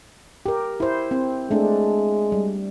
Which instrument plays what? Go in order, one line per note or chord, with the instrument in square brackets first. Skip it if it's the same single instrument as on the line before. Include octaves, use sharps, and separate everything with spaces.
[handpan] G4 A#4
E4 C5
C4
[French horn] G#3 [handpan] A3 D4
[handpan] G3